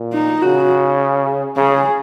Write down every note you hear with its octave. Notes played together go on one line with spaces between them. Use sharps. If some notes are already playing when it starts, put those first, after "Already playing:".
Already playing: A#2
D#4
C#3 F#4
C#3 G#4